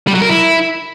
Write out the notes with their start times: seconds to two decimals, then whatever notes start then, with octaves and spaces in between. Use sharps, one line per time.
0.07 G3
0.15 F#3
0.22 A#4
0.29 E4